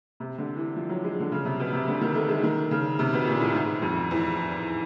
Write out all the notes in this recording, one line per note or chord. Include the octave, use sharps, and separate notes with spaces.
C3
D3
E3
F3
F#3
G#3
D3
C#3
C3
B2
C3
D3
D#3
A3
G#3
D#3
C#3
C3
B2
A#2
A2
G#2
F2
E2